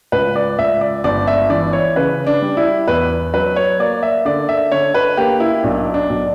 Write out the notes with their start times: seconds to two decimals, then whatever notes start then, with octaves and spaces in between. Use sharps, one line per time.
0.12 C#2 B4
0.36 D5
0.58 C#2 E5
0.81 D5
1.04 G1 D5
1.27 E5
1.50 E3 D5
1.73 C#5
1.96 C#3 B4
2.26 D4
2.42 G3
2.57 E4
2.88 E2 B4
3.34 F#3 B4
3.56 C#5
3.79 A#3 D5
4.03 E5
4.25 D3 D5
4.49 E5
4.72 D3 C#5
4.94 B4
5.17 A#3 G4
5.40 E4
5.63 B1 D4
5.94 D4
6.09 B1